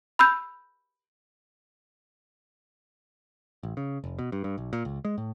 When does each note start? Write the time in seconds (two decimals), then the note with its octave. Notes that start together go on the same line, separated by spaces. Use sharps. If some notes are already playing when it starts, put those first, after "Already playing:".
0.19 B5 E6 G6
3.63 A1
3.77 C#3
4.04 F1
4.19 B2
4.32 G2
4.44 G2
4.58 B1
4.73 A#2
4.85 C#2
5.05 G#3
5.18 A2